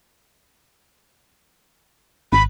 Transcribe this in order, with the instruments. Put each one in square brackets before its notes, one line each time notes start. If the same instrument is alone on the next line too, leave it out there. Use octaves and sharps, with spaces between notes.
[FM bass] G#1 [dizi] B5